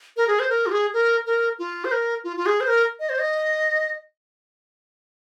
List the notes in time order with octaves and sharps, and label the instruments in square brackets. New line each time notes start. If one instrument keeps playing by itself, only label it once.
[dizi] A#4
G#4
C5
A#4
F4
G#4
A#4
A#4
F4
C5
A#4
F4
F4
G#4
C5
A#4
D#5
C5
D#5